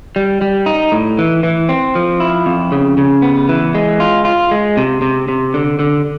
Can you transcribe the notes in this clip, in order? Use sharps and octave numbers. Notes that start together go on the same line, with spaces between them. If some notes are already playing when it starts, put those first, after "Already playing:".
G3
G3
D#4
A2
E3
E3
C4
F3
E4
F2
C#3
C#3
B3
E3
G#3
F4
F4
G#3
C3
C3
C3
D3
D3